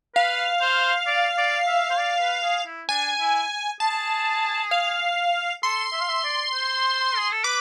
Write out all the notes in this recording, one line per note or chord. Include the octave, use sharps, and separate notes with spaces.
B4 F5
C5
D5
D5
E5
C5
D5
B4
G#4
E4
D4 G#5
E4
G#4 A5
F5
A4 C6
E5
F5
E5
D5
C5
G#4
A4
B4 D6